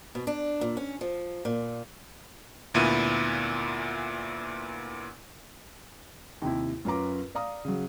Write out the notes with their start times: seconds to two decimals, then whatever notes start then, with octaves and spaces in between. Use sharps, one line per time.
0.15 B2
0.27 D4
0.61 A#2
0.77 C#4
1.01 F3
1.45 A#2
2.74 D2 A#2 B3 E4 D#7
6.42 D#2 C3 E4
6.85 F#2 C#4 F4 B4 A#5 D6
7.35 D5 F5 A#5 D#6
7.65 C#3 F#3